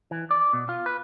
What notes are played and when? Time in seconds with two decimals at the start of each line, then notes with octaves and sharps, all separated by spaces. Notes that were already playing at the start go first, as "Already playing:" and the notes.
0.11 E3
0.31 D5
0.53 B2
0.69 F4
0.86 B4